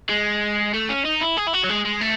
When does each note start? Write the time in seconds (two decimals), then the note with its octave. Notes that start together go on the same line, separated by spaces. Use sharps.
0.09 G#3
0.74 A3
0.89 C#4
1.05 D#4
1.21 E4
1.37 G#4
1.47 E4
1.53 F#4
1.63 F#3
1.69 G#3
1.85 G#3
2.01 A3